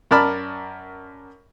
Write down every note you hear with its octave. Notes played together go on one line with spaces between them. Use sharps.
F#2 A#4 D5 A5 B5 F6